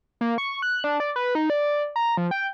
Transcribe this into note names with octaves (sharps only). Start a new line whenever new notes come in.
A#3
C#6
F#6
D4
D5
B4
D#4
D5
A#5
F3
G5